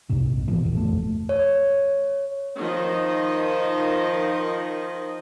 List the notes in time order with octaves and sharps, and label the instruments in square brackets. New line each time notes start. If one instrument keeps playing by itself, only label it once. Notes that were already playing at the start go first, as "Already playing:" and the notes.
[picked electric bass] C2 F2 G#2 C3
A#1
B2 E3 F3
A#1 E2
F#1 A3
[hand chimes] C#5
[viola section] D#3 F3 D#5